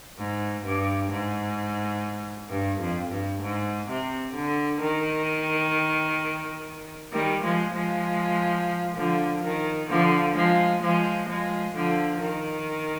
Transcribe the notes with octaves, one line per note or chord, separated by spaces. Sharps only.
G#2
G2
G#2
G2
F2
G2
G#2
C3
D3
D#3
D#3 G3
F3 G#3
F3 G#3
D3 F3
D#3
D3 F3
F3 G#3
F3 G#3
F3 G#3
D3 F3
D#3